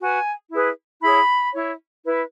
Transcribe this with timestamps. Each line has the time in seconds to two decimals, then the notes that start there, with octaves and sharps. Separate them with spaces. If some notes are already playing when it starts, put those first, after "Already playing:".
0.01 F#4 B4 G#5
0.52 E4 G#4 B4
1.02 E4 G#4 C#5 B5
1.53 E4 C#5
2.04 E4 B4